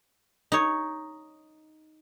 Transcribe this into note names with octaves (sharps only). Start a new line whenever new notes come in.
D#4 C#5